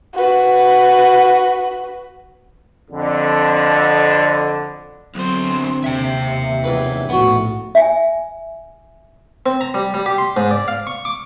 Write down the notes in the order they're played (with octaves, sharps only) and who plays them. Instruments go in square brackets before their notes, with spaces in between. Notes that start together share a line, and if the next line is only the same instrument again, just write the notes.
[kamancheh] F#4 B4
[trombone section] F2 D3
[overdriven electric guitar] B1 C5 [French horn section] D3 C4 [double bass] F#3
[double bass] D#2 C3 [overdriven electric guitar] E5 G5
[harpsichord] E2 B4 [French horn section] F3 C#4 D#4
[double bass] A#1 A2 [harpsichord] B3 F#4
[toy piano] E5 G#5
[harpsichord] C4
A#5
G3
G3
G4
C6
G#2
D5
F5
C#6
D6